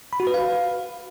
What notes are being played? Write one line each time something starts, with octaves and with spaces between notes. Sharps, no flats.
B5
F#4
B4
F5